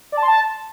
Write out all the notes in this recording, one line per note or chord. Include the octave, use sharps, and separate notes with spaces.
D5
A5
C6
A5